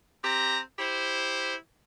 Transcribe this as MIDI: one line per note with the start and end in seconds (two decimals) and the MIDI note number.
0.24 0.60 60
0.24 0.60 67
0.24 0.60 82
0.79 1.54 64
0.79 1.54 67
0.79 1.54 72